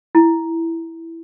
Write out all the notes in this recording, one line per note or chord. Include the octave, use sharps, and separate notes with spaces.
E4